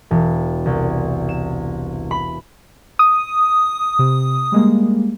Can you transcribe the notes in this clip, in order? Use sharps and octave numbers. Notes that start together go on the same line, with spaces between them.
E1
C2
E7
B5
D#6
C3
G3 G#3 A#3